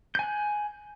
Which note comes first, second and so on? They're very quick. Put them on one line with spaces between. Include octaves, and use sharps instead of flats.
G6 G#5 F#6